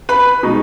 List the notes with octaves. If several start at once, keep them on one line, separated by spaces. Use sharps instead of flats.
B4 B5
B2 G#3 D#4